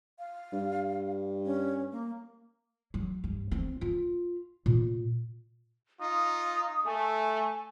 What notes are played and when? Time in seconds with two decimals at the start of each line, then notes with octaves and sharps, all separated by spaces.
0.19 F5
0.53 G2
1.45 C#4
1.92 A#3
2.94 F#3
3.24 G2
3.51 C4
3.81 F4
4.66 A#2
6.00 D#4 F4 D#6
6.86 A3 G#5